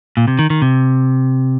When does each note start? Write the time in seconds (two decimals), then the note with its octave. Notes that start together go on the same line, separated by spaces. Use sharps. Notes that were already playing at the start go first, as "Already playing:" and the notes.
0.17 A#2
0.28 C3
0.39 D#3
0.50 D#3
0.62 C3